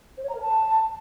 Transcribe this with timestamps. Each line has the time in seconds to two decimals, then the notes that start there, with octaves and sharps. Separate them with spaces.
0.17 C5
0.23 C#5
0.29 A#5
0.35 A#4
0.41 A5